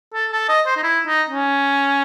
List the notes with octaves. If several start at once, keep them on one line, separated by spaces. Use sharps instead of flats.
A4
A4
D#5
C5
D#4
E4
D#4
C#4